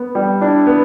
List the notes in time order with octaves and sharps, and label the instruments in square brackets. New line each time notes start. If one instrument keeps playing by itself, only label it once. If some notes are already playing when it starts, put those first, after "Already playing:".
Already playing: [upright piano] B3
G3
[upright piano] D4 [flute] E4
[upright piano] B3